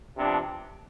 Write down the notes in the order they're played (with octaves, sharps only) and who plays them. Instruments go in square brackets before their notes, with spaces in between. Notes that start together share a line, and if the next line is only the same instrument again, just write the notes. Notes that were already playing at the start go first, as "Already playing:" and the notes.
[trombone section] C3 F3 B3 D4